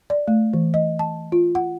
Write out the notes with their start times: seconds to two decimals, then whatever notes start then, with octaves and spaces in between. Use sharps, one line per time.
0.10 D5
0.28 A3
0.53 E3
0.74 D#5
0.99 A5
1.32 F4
1.55 F#5